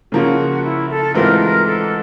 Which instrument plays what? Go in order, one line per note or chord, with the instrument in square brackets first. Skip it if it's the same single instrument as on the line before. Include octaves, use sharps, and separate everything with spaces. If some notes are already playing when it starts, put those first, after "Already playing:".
[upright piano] C#3 F3 A#3 C#4 F4 [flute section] F#4
[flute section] E4
A4
[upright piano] G#2 E3 A3 C4 F4 [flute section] A#4
[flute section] A#4
A4